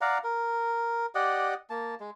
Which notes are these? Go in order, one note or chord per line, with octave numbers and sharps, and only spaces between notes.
D5 F5 F#5 A#5
A#4
G4 D5 D#5 F#5
A#3 A5
G#3